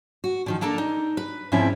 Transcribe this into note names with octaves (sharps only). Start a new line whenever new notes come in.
F#4
D3 D#3 F3
A#3 D4 A4 A#4 A#5
D#4
B4
E2 G#2 F3 C4 C#4 E4